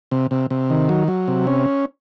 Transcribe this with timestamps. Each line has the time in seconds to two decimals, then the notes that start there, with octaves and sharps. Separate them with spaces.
0.11 C3
0.31 C3
0.50 C3
0.70 D#3
0.89 F#3
1.08 F#3
1.28 C3
1.47 C#4